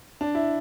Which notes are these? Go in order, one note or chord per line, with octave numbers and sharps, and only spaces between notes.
D4
E4